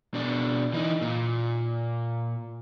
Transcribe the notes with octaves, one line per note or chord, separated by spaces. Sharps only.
B2 D4
E3 D#4
A#2